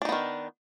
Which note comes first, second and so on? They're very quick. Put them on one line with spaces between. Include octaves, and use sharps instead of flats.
D4 D#4 B3 D#3